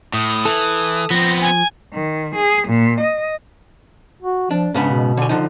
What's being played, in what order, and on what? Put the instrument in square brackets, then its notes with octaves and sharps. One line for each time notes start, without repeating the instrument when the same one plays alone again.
[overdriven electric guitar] A2 [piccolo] D#6
[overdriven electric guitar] E3 [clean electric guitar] A4
[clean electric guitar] F3 [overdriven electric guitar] B3 C4 [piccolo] A#6
[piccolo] G#5
[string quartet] D#3
G#4
A#2
D#5
[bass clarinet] F#4
[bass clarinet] F3 [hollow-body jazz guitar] D4
[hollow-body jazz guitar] G#2 C#3 B3 [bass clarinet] D4
[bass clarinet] B2
[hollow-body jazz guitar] D3 G#5
D3 F3 D#4